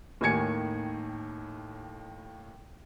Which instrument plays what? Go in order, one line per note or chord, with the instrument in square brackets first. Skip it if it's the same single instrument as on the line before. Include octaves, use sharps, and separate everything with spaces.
[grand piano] D#2 A2 D#3 G#5 G#6 C#7